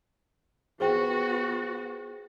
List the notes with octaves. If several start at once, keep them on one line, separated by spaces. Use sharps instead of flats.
B3 F#4 G#4 C5 G5